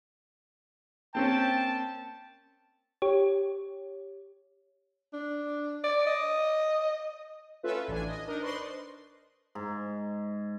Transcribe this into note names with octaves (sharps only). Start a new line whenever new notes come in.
A#3 C4 C#4 G5 A5
G4 C#5
D4
D5
D#5
A3 C#4 F4 A4 B4 E5
A1 D4 G#5
D#5
D4 D#4 A#4 D#5
B4 C5 D5 D#5 C6 C#6
G#2